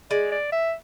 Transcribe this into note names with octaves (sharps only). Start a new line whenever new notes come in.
G#3 D5
D5
E5